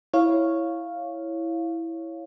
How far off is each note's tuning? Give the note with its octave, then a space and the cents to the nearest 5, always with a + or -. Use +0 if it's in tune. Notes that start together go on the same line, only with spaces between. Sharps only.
E4 +0 C#5 -5 F5 +0